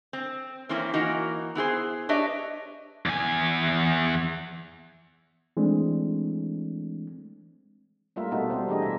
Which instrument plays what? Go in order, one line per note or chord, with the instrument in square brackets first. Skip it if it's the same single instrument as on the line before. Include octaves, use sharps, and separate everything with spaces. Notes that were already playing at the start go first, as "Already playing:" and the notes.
[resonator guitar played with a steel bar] C4
E3 A#3 C4 C#4 E4
E3 A#3 D#4 F#4
B3 E4 G#4 C5
D4 G4 B4 C#5 D#5 E5
[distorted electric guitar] E2 G#5
[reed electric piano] E3 G#3 A3 C4 D4
[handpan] G3 A3 A#3 F4 A#4 E5
B2 A3 B3 D#4 F#4 A4
G3 C4 C5
E3 A3 D4 G4 G#4 D#5
B2 E5